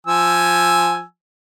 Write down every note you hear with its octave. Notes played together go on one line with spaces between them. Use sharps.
F3 G#5 E6